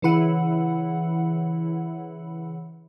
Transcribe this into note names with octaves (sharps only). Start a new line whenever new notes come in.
C#3 E3 E4 F#5